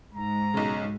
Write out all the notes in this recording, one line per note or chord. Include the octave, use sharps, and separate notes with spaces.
G#2 A#5
B1 C#3